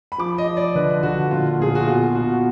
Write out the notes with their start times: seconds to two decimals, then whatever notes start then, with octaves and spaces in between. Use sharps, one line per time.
0.12 B5
0.18 F3 D6
0.38 D#5
0.47 F3
0.57 D5
0.75 D3 B4
1.03 D3 F#4
1.31 A#2 F4
1.60 A#2 G#4
1.75 F#4
1.87 B2 F4
2.15 B2 F#4